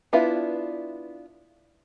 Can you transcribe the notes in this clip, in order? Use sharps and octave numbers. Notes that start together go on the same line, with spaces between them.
B3 D4 E4 F4 B4